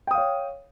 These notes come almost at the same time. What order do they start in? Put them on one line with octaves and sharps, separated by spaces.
G5 D#6 F5 C#5